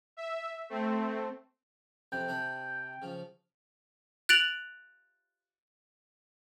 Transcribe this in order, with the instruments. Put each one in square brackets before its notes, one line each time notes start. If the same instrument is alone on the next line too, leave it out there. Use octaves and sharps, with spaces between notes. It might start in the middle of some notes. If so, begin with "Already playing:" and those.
[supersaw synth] E5
A3 C4
[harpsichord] F2 C3 B4 [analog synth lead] G5
[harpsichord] C3 D4 B5
C#3 F3
[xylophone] F#6 A6 D7 F7 F#7